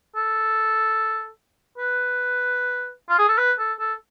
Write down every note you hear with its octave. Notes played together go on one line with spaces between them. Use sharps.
A4
B4
F4
G#4
A4
B4
A4
A4